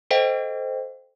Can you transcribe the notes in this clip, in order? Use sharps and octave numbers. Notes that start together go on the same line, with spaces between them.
A4 C5 D#5 F5 G5